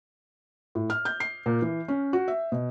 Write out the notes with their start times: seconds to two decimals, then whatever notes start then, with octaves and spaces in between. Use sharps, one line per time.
0.75 A2
0.90 F6
1.05 G6
1.20 C7
1.46 A#2
1.62 E3
1.88 C#4
2.13 F#4
2.28 E5
2.52 B2